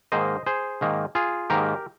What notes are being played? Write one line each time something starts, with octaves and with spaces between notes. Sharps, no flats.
G#2 D#3 A#3 C5 D#5
G#4 C5
G#2 D#3 A#3
F4 G#4
G#2 D#3 A#3 G4 A#4